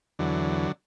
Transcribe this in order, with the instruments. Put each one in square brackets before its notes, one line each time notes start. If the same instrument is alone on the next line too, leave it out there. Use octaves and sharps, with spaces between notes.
[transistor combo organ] E2 D3 F#3